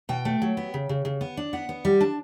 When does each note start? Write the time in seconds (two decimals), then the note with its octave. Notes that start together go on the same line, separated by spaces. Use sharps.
0.09 B2 G5
0.25 A3
0.42 F#3
0.57 B3
0.74 C#3
0.89 C#3
1.05 C#3
1.21 B3
1.37 D4
1.53 B3 F#5
1.69 B3
1.85 G3
2.00 D4 A5